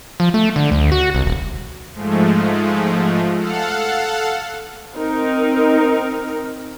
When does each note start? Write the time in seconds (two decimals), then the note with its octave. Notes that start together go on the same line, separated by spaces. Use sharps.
0.20 F3
0.34 A3
0.56 D3
0.72 D2
0.92 F#4
1.15 C2
1.26 D#1
1.93 G#2 F3 G#3 A3
3.36 A4 F5 F#5
4.96 C4 D#4 A#4